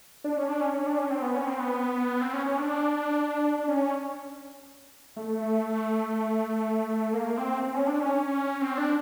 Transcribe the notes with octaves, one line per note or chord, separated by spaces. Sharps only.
D4
C#4
D4
C#4
C#4
D4
C#4
C4
B3
C#4
C4
B3
C4
C#4
C#4
D4
D4
C#4
A3
A#3
C4
C4
C#4
D4
C#4
C4
D4